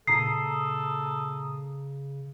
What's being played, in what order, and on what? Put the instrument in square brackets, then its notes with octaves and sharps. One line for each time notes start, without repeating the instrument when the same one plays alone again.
[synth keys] A#2 A#5 D#6 [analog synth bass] C#3 [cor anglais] A4 [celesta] C7